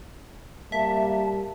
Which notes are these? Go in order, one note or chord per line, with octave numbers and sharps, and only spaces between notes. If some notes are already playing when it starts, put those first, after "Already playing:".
G3 A#3 E5 A5